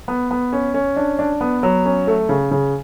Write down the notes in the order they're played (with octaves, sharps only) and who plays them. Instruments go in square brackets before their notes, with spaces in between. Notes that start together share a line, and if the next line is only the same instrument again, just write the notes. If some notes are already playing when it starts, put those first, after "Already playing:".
[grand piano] B3
B3
C#4
C#4
D4
D4
B3
F#3
C#4
A3
C#3
C#3